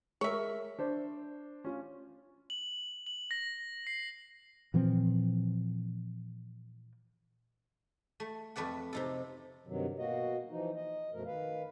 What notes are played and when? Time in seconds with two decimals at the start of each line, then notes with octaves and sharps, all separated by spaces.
0.21 G#3 A#4 C#5 E5
0.79 D4 C5
1.64 C#4 F4
2.50 F#7
3.07 F#7
3.31 A#6
3.87 C7
4.74 A#2 E3 F3 C4
8.20 A3
8.56 F2 A3 B4 D5 F#5
8.93 C3 D#4 A4
9.67 G2 C3 D#3 F#3
9.98 B2 A#3 F#4 D#5
10.50 E3 F3 D#4
10.76 D#5
11.13 F#2 B2 F3 A3 A#4
11.26 D#3 B4 F5